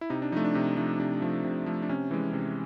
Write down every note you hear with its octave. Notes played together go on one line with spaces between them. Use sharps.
E4
C3 D#4
D4
F3 A3 D#4
D4
C3 D#4
F3 A3 D#4
C3 D4
F3 A3
C3
F3 A3
D4
C3 C#4
E3 G#3
C3